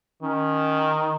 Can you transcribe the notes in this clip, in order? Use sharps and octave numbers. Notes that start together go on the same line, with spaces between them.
D#3 C#4